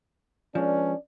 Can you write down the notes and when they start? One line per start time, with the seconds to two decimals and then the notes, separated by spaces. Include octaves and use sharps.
0.55 F3 G#3 C#4 D4 B4 D5